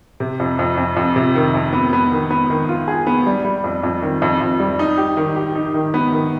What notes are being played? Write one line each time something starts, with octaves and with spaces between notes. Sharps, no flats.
C3
F2
F2
F2
F2
C3
D#3
F2
B3
B3
D#3
B3
D#3
F4
G#4
B3
G3
G3
F2
F2
D#3
F2
F2
G3
D#4
G4
D#3
G4
D#4
D#3
B3
D#3